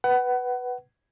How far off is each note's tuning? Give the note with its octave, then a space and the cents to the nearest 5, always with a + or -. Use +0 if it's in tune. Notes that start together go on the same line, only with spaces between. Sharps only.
B4 +0 F#5 +25